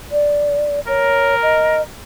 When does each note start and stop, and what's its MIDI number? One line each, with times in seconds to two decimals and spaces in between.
0.12 0.80 74
0.88 1.82 70
0.88 1.35 73
1.43 1.82 75